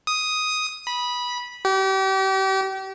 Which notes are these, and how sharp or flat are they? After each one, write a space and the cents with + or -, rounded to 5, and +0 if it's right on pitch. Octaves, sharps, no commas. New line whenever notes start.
D#6 +5
B5 -15
G4 -35